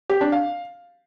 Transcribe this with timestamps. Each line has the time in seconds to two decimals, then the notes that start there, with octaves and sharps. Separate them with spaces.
0.10 G4
0.21 D4
0.32 F5